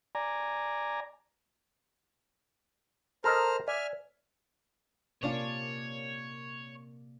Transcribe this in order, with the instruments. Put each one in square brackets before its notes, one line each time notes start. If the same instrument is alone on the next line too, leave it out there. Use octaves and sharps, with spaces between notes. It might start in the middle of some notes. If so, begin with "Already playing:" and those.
[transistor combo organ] D5 G#5 A#5
[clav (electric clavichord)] A4 A#4 D#5 [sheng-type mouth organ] C5 A#5 F6
[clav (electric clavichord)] D5 [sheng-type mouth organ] E5 G#5 F6
[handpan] C3 A#3 D5 [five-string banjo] C#4 D4 F4 [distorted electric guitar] C#5